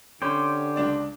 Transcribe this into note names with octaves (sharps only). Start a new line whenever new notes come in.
D3 C#4 G4 C5
C#2 D4 D5